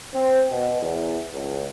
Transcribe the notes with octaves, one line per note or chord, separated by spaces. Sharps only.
C4
B2
E2
C#2